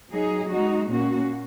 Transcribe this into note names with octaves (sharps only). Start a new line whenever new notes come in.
F#3 D#4 G#4
G#3 D#4 F#4
A#2 A#3 C#4 F#4